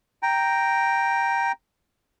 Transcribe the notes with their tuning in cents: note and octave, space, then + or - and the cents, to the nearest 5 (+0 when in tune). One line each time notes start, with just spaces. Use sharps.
G5 +0 A#5 +0